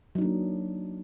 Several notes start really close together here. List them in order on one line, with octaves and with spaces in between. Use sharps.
F#3 D#4 D4 A#3